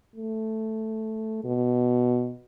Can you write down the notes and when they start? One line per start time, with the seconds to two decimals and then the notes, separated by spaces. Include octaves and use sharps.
0.16 A3
1.44 B2